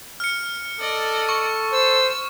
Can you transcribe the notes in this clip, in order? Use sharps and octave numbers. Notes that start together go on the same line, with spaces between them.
F6 C#7
A4 D5 D#5
C#6
C5 E6